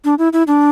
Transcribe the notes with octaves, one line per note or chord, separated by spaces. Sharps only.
D4
E4
E4
D4